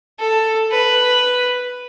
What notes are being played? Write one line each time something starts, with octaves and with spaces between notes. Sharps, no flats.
A4
B4